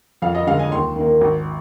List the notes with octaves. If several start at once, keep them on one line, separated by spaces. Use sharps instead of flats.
F2 F5
D#5
D3 G#3 F5
G#5
D#2 C6
D#3 A#3
G#1